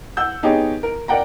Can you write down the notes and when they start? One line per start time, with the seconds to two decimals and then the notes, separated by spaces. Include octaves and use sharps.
0.17 F#5 E6 G6
0.43 B3 D#4 G4 G#4 C#5
0.83 A#4
1.08 A#4 D5 F#5 G5 A#5